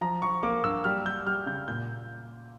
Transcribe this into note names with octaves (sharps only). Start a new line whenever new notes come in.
F3 A#5
F3 C#6
A#3 D6
G2 E6
G3 F6
G3 G6
G3 F6
C#3 G6
A#2 G6